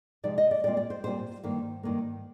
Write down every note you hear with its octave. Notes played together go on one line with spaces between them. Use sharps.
C3 F3 G#3 D#4 D5
D#5
D5
A#2 G3 C4 F4 D5
D5
C5
A#2 G3 C4 F4 C5
G2 D#3 A#3
G2 D#3 A#3